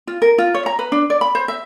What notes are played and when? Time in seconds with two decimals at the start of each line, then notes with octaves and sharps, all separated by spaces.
0.07 F4
0.22 A#4
0.38 F4
0.54 C#5
0.66 A#5
0.79 B4
0.92 D4
1.10 D5
1.21 B5
1.35 C5
1.48 E5